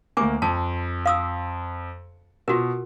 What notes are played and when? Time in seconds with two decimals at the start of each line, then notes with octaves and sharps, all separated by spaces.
0.17 D2 A#3 G#5 D6
0.42 F2 A5
1.06 F5 D#6 E6
2.48 B2 F4 F#4 A#4